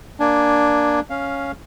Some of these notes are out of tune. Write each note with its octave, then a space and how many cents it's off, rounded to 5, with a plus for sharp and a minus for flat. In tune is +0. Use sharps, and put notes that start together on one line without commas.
A#3 +0 D4 +0 G#5 +0
C#4 +0 F5 +0